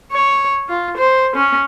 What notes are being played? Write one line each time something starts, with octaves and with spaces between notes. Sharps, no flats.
C#5
F4
C5
C#4